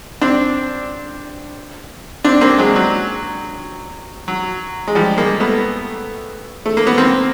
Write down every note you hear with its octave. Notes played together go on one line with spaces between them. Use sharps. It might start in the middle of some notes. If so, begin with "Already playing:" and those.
C4 D4
C4 D4
A#3 C4
F#3 G#3
F#3
F#3
G#3
F3 G3
G#3 A#3
A3 B3
A3
A#3
B3
A#3 C4